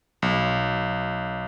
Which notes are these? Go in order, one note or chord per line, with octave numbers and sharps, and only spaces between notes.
B1